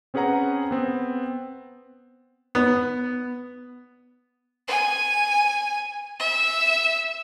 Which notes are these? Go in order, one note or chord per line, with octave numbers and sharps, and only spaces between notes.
C4 C#4 G#4 B4 F#5 A#5
B3 C4
B3
G#5
E5